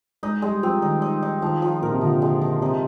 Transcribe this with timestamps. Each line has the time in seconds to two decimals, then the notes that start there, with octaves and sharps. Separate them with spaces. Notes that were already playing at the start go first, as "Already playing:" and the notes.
0.23 G#3 D#4
0.42 G3 G#3
0.62 F3 C4
0.82 D#3 D#4
1.02 D#4
1.22 D#4
1.42 D#3 F3
1.62 F3
1.82 A#2 A#4
1.92 C3
2.01 D3 F3
2.22 G#3
2.42 F3
2.61 C3 D#4